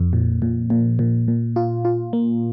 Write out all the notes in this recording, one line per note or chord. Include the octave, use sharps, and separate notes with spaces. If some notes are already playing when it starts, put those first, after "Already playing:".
Already playing: F2
A#2
A#2
A#2
A#2
A#2
F4
F4
A#3